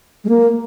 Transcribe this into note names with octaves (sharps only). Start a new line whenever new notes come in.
G#3
A#3